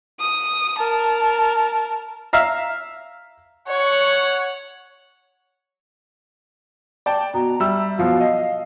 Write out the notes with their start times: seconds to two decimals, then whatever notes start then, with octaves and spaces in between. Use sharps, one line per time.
0.20 D#6
0.77 A#4 A5
2.33 E5 F5 A#5
3.68 C#5 F#5
7.06 D5 G5 A5
7.34 B2 A#5
7.60 G3 E5 E6
7.98 B2 F3 F#3 F5
8.21 D#5